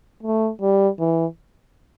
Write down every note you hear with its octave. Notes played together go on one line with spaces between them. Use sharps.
A3
G3
E3